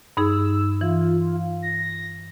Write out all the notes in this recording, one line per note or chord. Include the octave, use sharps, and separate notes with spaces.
G2 D#4 G#4 E6
E3 F4
A#6